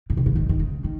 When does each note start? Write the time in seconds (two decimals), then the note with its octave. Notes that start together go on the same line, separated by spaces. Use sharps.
0.10 C#3
0.17 C3
0.26 C#3
0.36 D#3
0.49 D#3
0.59 C#3
0.84 D#3